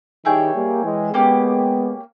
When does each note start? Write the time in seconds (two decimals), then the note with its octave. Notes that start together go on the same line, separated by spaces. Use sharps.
0.25 D#3 G3 E4 G#4 C#5 G5
0.55 G3 A#3
0.84 E3 G#3
1.13 G#3 A#3 B3 C#4 G4